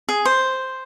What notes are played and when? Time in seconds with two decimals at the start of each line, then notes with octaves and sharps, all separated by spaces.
0.09 G#4
0.25 C5